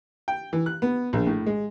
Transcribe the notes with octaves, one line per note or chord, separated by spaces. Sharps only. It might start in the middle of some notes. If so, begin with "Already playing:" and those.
G5
E3
F#6
B3
A#1
A2
G#3